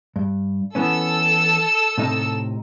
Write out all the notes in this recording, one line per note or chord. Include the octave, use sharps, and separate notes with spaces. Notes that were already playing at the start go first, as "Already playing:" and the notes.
G2
E3 B3 C#4 A4 E6
A2 C3 D#4